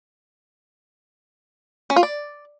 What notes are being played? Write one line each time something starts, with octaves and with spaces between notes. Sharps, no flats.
C#4
F4
D5